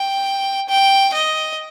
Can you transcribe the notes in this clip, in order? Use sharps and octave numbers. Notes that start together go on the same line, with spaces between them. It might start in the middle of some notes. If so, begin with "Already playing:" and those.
Already playing: G5
G5
D#5